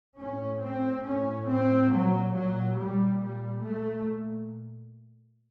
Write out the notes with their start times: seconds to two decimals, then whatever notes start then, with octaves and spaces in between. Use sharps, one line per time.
0.18 A2 C#4
0.61 C4
1.05 A2 C#4
1.48 C4
1.92 A#2 F#3
2.34 F#3
2.78 A#2 G3
3.22 G3
3.64 A#2 A3